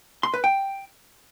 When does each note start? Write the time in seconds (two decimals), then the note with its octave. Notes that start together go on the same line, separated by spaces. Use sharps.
0.23 C6
0.34 B4
0.44 G5